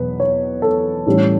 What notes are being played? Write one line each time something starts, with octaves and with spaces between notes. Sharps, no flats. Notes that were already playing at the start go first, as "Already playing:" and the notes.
Already playing: E2 B2 F#3 B3 B4
C#5
A4
A2 E3 G3 C#4